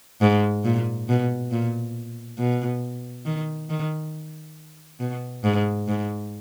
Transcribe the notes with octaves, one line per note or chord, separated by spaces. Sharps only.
G#2
A#2
B2
A#2
B2
D#3
D#3
B2
G#2
G#2